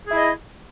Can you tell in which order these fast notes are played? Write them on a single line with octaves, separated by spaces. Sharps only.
G#4 E4 D#5